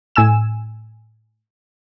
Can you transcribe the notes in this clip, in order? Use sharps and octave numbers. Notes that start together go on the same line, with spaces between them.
A2 G#5 E6 E7